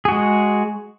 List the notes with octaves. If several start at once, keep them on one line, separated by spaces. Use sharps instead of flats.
G#3 F#4 G#4